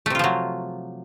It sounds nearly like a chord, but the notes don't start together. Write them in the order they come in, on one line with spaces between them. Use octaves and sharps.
A3 C3 F4 F3 F#3